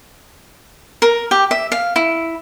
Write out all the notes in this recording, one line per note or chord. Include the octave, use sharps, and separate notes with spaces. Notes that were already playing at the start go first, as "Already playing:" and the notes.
A#4
G4
E5
F5
E4